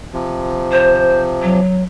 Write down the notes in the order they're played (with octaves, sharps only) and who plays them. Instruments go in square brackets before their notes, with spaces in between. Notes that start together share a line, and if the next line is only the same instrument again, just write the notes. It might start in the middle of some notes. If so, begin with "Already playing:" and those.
[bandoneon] C3 F3
[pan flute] C5
F#3